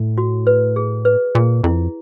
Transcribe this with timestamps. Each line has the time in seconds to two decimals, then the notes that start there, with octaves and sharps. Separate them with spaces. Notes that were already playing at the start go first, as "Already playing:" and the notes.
Already playing: A2
0.18 F#4
0.47 B4
0.76 G#4
1.05 B4
1.35 A#2 G#4
1.64 F2 E4